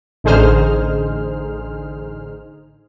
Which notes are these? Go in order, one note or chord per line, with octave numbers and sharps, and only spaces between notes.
A1 D3 D#4 G#4 C5 F6